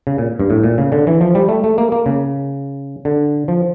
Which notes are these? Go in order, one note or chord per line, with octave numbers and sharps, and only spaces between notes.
C#3
A#2
G2
A2
A#2
C#3
D3
E3
F3
G3
A3
A3
A#3
A#3
C#3
D3
F3